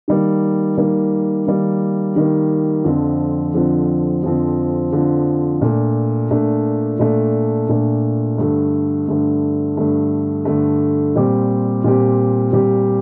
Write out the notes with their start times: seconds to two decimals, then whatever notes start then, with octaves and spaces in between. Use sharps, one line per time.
0.08 D#3 G3 A#3
0.78 D#3 G3 A#3
1.47 D#3 G3 A#3
2.16 D#3 G3 A#3
2.84 F2 D3 F3 C4
3.54 F2 D3 F3 C4
4.24 F2 D3 F3 C4
4.93 F2 D3 F3 C4
5.61 A#2 A3 D4
6.31 A#2 A3 D4
6.99 A#2 A3 D4
7.69 A#2 A3 D4
8.38 G2 D3 A3
9.08 G2 D3 A3
9.77 G2 D3 A3
10.45 G2 D3 A3
11.15 A#2 G3 C4 G4
11.84 A#2 G3 C4 G4
12.53 A#2 G3 C4 G4